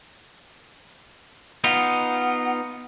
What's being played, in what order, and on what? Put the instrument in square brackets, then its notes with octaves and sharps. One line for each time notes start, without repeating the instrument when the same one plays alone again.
[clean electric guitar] B3 D#4 F4 [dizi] F#5